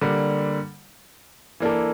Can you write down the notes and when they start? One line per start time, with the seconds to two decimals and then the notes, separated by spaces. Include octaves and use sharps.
0.01 D3 G3 A#3
1.60 E3 A#3 D4 A4